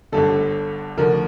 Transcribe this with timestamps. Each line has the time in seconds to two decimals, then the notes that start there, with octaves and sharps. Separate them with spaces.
0.12 G1 G2 D3 A4
0.98 D2 D3 F3 A#4